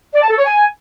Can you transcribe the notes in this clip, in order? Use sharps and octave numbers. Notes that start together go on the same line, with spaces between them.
D5
A5
A4
C#5
G#5